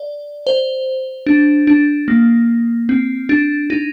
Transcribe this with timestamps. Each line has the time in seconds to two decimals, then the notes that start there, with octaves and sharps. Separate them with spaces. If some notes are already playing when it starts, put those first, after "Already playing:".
Already playing: D5
0.47 C5
1.26 D4
1.67 D4
2.08 A#3
2.89 C4
3.29 D4
3.70 D#4